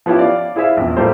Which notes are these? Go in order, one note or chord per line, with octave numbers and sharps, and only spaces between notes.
F3 B3 C#4 E4 G4
D5 F5
E4 G#4 C5 E5 F5
A#1 E2
A2 G3 A3 A#3 G4 C5